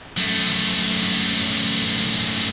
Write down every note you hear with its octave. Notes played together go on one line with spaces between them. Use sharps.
F#2 A3